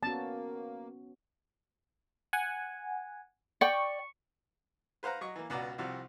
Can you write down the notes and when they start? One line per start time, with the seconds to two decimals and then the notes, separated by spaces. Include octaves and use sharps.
0.03 A#3 B3 C#4 F#4 A5
2.33 F#5 G#5
3.61 D5 G5 C#6
5.03 B4 C5 F5 F#5 A#5
5.21 F#3 D#5 C#6
5.36 E3 A#3
5.50 C#2 B2 F#4 D5 A#5
5.78 C2 C3 F3 F#4